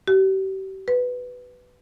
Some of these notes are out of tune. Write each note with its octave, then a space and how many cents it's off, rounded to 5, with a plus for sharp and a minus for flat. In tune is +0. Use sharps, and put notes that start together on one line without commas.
G4 -40
B4 +5